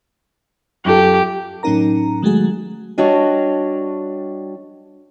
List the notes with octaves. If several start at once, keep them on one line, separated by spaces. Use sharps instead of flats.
F#2 F4 G4 A4
A2 F#3 C#4 D#4 A#4 A#5
D#3 F#3 G#3 A3 F#4 G#4
G3 D4 F#4 C#5 D#5